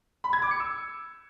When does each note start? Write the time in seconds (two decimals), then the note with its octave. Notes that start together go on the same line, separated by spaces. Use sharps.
0.24 B5
0.33 G#6
0.42 D6
0.51 C#7
0.60 E6